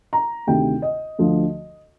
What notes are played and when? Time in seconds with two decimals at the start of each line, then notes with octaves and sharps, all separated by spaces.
0.13 A#5
0.47 D2 C3 D#3 G5
0.82 D#5
1.19 D2 D3 F3